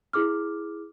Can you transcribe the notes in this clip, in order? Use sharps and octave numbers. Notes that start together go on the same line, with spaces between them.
E4 G#4 D6 F6